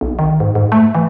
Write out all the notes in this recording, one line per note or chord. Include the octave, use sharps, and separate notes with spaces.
B1
D#3
G#2
G#2
A3
E3